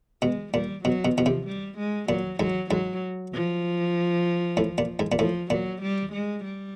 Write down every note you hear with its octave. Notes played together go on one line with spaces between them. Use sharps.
B2 G#3
A#2 G3
B2 F#3
B2
B2 F3
C3
G3
G#3
A#2 F#3
G#2 F#3
G#2 F#3
F3
A2
A#2
G#2
A#2
A2 F3
A#2 F#3
G3
G#3
G3